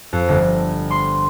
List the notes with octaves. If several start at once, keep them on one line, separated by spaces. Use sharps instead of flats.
F2
G1
C6